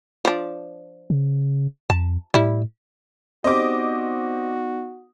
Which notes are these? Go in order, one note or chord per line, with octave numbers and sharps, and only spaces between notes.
F3 D4
C#3
F2 A5
A2 G3 E4
B3 C4 D#4 F#4 G4 D5 D#5 D6